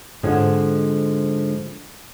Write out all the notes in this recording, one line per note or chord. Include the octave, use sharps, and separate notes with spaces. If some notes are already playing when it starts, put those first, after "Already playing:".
G#2 D3 F3 G#3 C4